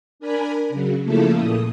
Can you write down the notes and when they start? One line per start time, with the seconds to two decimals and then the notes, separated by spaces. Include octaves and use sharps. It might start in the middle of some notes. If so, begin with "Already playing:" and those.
0.20 D4 A#4 G#5 B5
0.69 C#3 F#3
1.04 C#3 F3 A3 A#3 E4 A4
1.34 A#2 D#6